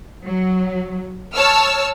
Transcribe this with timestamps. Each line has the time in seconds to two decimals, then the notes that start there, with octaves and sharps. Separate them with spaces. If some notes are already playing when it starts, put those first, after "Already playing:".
0.24 F#3
1.34 C#5 A5 E6 F6